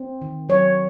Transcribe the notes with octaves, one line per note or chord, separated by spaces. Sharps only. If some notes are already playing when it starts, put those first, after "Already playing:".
Already playing: C4
D#3
F#3 C#5